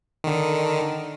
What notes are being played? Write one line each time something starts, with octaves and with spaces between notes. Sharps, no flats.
D3 D#3